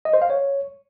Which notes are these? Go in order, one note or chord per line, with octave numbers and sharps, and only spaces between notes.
D#5
C5
F5
C#5